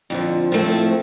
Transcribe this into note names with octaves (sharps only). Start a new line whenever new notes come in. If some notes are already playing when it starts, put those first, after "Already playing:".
F2 D3 F3
A2 F3 A3 C4